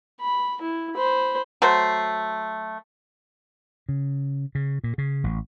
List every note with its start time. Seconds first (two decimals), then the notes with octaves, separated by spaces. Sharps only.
0.21 B5
0.62 E4
0.96 C5 B5
1.62 F#3 A3 F#4 C5
3.89 C#3
4.55 C#3
4.84 A#2
4.98 C#3
5.24 A1